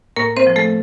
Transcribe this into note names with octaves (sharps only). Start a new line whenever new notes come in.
A2 A#3 A#4
C4 C5
F3
A3 A4